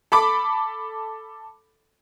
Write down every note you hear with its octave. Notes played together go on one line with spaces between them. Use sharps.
A4 B5 D6